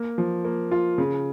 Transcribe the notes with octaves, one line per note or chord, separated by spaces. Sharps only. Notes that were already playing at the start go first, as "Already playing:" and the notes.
Already playing: A#3
F3
A#3
F4
C#3